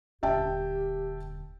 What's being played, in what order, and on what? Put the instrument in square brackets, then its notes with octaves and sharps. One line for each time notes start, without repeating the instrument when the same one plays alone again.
[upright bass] D#1 D3 [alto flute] G4 [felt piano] E5 G5 A5